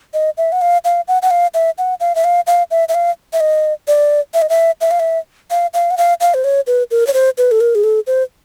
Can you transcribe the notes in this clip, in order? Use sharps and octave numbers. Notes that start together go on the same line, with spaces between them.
D#5
E5
F#5
F5
F5
F#5
F#5
F5
E5
F#5
F5
E5
F5
F5
E5
E5
F5
E5
D#5
D5
E5
D#5
E5
E5
F5
E5
F5
F5
F#5
F5
F5
C5
C#5
B4
A#4
C#5
C5
B4
A4
A#4
G#4
A4
C5